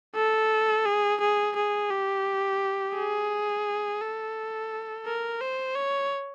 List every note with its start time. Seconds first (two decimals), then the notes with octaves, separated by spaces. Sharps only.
0.16 A4
0.86 G#4
1.20 G#4
1.56 G#4
1.90 G4
2.96 G#4
4.01 A4
5.06 A#4
5.41 C5
5.76 C#5